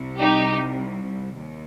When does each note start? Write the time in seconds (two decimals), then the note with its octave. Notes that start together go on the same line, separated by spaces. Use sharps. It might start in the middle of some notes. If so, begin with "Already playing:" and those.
Already playing: C2 C3 G3
0.19 D#4 G4
1.35 D#2